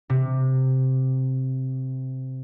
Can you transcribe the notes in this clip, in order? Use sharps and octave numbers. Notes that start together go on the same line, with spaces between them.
C3